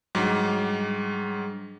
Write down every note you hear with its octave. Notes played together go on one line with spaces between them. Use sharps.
G#2 F#3 G3 D4 G#4